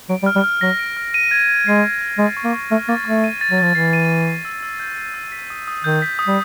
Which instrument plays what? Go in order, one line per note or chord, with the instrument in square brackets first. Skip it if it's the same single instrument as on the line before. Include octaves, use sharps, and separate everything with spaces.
[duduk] F#3 [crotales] D7
[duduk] G3
[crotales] F6
[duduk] G3
[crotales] F6
[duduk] F#3 [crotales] A#6
[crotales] D7
F6
D#7
G#6
G#6
[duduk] G#3 [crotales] C7
[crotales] D#7
G#6
[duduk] G#3 [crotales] A6
[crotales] C#6
[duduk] A#3
[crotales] C#6
[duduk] A3 [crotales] F6
[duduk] A#3 [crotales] A6
[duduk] A3 [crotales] C#6
[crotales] D#7
A6
[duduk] F#3
[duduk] F3 [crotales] A6
[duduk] E3 [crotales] C7
[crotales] D#7
A6
C7
E6
E6
G6
C7
E6
B6
D#6
D#6
[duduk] D#3 [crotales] G6
[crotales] B6
D#6
[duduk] G3